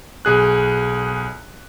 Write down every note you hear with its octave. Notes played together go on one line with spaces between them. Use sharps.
B1 G#4 F#6